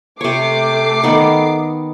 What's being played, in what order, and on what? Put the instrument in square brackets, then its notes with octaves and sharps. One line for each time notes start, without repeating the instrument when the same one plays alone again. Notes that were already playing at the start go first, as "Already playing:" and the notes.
[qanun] C3 C#5 [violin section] A3 D6 C7
[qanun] D#3 B3 D#4